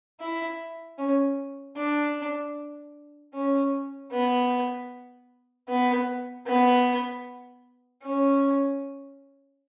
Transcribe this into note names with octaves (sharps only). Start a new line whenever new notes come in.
E4
C#4
D4
C#4
B3
B3
B3
C#4